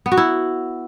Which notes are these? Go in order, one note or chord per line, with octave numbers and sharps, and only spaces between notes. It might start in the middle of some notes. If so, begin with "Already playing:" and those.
B3
F#4
E4